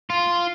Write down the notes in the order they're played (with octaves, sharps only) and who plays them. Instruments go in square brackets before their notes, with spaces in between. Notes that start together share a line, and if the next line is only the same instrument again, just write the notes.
[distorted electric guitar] F4